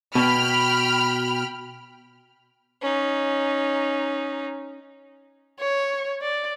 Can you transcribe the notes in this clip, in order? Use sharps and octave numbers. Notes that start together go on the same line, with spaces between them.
B2 G5 B5 F6
C#4 D#4
C#5
D5